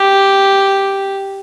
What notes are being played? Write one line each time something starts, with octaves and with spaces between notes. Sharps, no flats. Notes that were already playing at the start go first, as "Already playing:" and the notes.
Already playing: G4